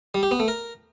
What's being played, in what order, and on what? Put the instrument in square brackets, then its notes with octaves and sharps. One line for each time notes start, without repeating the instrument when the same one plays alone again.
[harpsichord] G3
G4
B3
A3
A#4